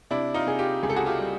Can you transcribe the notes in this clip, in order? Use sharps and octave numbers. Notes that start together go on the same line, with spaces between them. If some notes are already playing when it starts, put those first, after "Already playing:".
C3 D4 E4
D#4 F4
C3 G#4
F4 G4
C#2 G#4
A4
F#4 G#4
F4 G4
G3